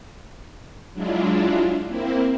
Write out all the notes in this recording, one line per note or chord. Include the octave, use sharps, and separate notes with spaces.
F#3 G#3 D4 E4 F4
A#3 C4 E4